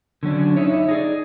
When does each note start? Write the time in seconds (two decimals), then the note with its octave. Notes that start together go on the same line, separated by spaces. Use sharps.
0.23 D3 F#3 C#4 D4
0.57 D#4 E4 C#5
0.89 D#4 G#4 D5